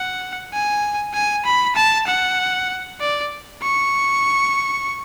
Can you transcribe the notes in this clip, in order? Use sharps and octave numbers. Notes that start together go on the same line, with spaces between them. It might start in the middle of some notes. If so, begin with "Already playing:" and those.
Already playing: F#5
G#5
G#5
B5
A5
F#5
D5
C#6